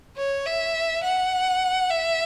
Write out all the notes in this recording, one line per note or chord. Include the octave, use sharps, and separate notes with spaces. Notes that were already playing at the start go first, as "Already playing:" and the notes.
C#5
E5
F#5
E5